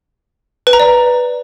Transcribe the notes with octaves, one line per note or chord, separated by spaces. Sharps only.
B4
A#5
D5